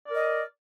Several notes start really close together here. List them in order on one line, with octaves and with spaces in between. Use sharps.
D5 A#4 D#5